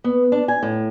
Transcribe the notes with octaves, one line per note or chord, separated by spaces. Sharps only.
B3
D4
G#5
A2